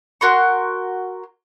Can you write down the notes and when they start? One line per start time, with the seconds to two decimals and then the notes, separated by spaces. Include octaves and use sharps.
0.21 F#4 A#4 C6 C#6